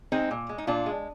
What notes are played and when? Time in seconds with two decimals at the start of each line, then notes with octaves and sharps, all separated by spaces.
0.12 G#3 C4 D#4
0.31 A#2
0.49 G#3
0.58 D#4
0.67 A#2 D4 F4
0.86 G#3